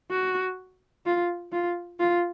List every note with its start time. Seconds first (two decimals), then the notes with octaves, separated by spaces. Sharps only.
0.11 F#4
1.06 F4
1.52 F4
2.00 F4